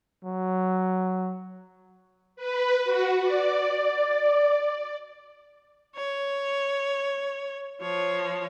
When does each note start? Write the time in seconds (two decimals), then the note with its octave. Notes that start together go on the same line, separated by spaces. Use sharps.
0.25 F#3
2.36 B4
2.84 F#4
3.21 D5
5.96 C#5
7.81 F3 C#5